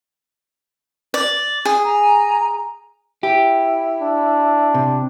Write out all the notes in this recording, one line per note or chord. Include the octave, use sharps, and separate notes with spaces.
D5
G#4
G#5 A#5
E4 G4
D4
C3